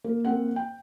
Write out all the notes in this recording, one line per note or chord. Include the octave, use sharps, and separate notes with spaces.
A#3
A#3 C4 F#5
G5